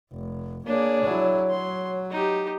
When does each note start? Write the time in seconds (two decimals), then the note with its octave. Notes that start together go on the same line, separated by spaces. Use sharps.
0.12 F1
0.67 A#3 D4 G#4 C#5
1.04 F#3 E4
1.50 F#3 C6
2.11 D#4 G4